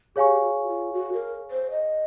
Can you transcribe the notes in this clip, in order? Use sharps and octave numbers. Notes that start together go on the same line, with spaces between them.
G4 G#4 C#5 F5 G#5 C#6
F#4
F4
F#4
A#4
C5
D#5